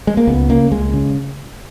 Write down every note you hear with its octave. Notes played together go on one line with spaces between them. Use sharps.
G#3
A#3
C#2 B3
C#3 A#3
C#2 G#3
C#3